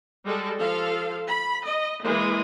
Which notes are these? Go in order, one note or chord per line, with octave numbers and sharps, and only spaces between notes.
G3 G#3 A4
F3 A4 F5
B5
D#5
E3 G#3 A#3